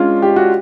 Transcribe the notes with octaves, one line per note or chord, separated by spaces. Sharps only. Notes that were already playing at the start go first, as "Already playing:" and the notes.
Already playing: G#3 C#4 D4 F4
G4
F#4